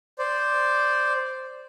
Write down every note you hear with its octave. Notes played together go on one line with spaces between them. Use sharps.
C5 D5